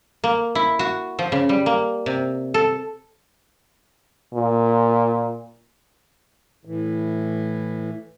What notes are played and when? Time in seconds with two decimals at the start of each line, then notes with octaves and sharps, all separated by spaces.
0.24 A#3
0.55 E4
0.79 F#4
1.19 F3
1.32 C#3
1.49 G3
1.66 A#3
2.06 C3
2.54 A4
4.34 A#2
6.65 A2 E3